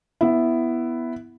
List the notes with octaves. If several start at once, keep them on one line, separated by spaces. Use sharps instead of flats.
B3 E4